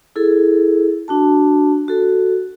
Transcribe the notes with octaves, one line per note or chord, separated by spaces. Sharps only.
E4 G#4 A4
D4 F#4 A5
F#4 A4